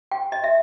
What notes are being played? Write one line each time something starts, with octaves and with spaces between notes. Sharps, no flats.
G5
D#5
E5